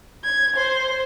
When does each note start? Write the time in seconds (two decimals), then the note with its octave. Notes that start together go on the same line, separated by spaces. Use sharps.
0.24 G#6
0.56 C5